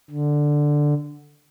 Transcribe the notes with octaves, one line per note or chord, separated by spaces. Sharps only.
D3